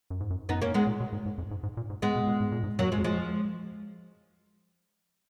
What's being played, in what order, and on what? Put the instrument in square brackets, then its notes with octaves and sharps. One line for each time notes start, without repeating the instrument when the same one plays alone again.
[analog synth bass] F#2
G#2
F#2
[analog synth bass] F#2 [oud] B3 D#4
[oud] A#3 C#4
G#3 B3
[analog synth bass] A#2
B2
G#2
G#2
F2
G#2
G#2
A#2
G#2
[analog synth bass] G#2 [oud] G#3 B3
[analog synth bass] B2
A#2
G#2
A#2
G#2
[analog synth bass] F#2 [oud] F#3 A#3
[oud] F3 G#3
[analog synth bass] F2
[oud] F3 G#3